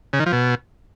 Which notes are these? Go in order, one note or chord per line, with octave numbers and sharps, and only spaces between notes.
C#3
D#3
F3
B2